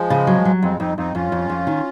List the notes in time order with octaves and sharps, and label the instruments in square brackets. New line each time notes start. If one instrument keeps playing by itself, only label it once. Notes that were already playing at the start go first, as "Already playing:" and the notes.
Already playing: [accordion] F3 G#3
[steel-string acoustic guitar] C#3
F#3
F#3
[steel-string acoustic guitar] F2 [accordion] G#3 C4
[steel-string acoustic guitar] F2 [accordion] C4 D#4
[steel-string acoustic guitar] F2 [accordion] C4 D#4
[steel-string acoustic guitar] F2 [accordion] C#4 F4
[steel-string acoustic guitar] F2
F2
D#3